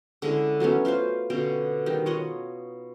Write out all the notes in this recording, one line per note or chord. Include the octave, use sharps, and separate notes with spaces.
D3 G#3 C#4 E4
F#3 A3 B3 C#4
F4 B4 C5 F5
B2 D3 C#4 G5
D#3 G3 D#4
F4 C#5 D#5 F#5